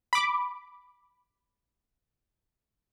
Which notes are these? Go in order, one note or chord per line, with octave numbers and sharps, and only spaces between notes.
B5 D6